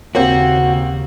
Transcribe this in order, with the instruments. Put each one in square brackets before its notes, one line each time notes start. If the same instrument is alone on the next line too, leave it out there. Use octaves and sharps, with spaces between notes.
[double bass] D#2 C#3 [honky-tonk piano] A#3 C4 G4 [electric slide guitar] F#4